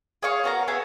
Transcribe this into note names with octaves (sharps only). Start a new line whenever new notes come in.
G#4 C#5 F5 C#6
B3 F#4 A#4 A#5
B3 G#4 E5 G#5